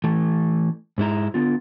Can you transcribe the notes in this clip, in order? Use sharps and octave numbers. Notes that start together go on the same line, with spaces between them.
E3 A3
G#2 G#3 E4 A#5
D3 B3 F4